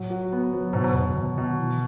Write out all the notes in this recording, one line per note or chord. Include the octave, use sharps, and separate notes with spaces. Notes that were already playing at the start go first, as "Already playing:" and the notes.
Already playing: A2 F#3
F#4
B3
F#3
G#2 B2
G#2
E2 B2
F#2
B2 D#3
B2
E3